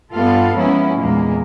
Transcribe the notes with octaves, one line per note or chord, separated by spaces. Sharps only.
G2 G3 B3 F4 A4 F5
F3 G#3 A#3 B3 C#4 E4
E2 A#2 G#3 A#3